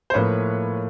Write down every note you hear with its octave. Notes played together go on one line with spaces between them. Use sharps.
C5
A2 F3 A#3 B4 C#5